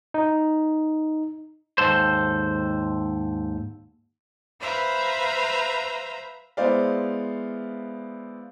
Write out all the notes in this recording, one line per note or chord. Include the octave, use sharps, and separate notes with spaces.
D#4
D#2 G#2 A4 C5
B4 C5 E5 F5 A#5
G#3 B3 E4 C5 D5 F5